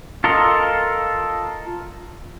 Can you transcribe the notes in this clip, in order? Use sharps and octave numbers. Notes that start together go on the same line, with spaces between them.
F4 A4 A#4 D#5